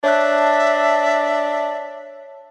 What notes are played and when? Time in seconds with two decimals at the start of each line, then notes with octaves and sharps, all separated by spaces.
0.04 D4 C#5 E5 A5 F#6